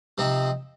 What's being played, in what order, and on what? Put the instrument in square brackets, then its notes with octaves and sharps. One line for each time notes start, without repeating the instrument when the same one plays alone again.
[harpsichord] C3 F3 C4 D#4